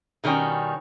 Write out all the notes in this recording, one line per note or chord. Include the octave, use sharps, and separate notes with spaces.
B2 D#3 G3 C#4